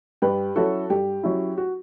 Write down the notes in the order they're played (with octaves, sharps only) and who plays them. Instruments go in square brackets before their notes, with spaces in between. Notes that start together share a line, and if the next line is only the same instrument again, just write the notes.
[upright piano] G2 G4 B4
F#3 C#4 E4 F#4 A4
G2 G4
F#3 C#4 E4
F#4